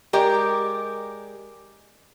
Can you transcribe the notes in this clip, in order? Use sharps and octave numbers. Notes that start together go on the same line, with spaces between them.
G#3 G4 A#4 D5